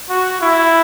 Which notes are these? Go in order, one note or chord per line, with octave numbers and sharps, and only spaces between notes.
F#4
E4